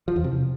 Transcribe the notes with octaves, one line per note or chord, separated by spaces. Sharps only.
F3
E2
C3